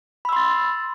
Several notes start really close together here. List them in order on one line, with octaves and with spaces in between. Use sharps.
B5 E6 C6 A6